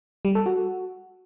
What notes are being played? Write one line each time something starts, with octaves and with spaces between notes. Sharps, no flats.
G3
A4
F#4